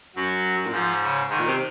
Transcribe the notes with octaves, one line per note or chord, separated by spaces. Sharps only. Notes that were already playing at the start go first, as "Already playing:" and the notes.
F#2 F#3
A#2
G#2 F3
C#3
G#2 D#3
A#2
C3